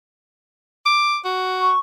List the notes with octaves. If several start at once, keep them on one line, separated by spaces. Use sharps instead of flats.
D6
F#4
C#6